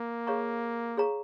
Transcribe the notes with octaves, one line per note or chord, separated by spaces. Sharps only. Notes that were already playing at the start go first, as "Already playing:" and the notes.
Already playing: A#3
G#4 C#5 F5 A#5 C#6
G#4 C#5 F5 A#5 C#6